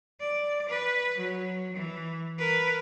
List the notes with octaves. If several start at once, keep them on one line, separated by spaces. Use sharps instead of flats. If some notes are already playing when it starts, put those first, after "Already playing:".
D5
B4
F#3
E3
A#4 B4